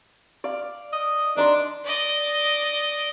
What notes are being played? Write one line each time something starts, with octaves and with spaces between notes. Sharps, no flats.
D5 F5
D#5
D4 D#4 D5 C6
D5 D#5